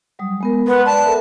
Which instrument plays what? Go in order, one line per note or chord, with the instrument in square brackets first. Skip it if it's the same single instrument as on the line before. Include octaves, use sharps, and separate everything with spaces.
[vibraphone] F#3 G3 D#6
G#3 B3 A#4
[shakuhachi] B4 [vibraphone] F#5 C6
[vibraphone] D5 [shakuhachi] A5
[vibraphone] A4 A#4 E5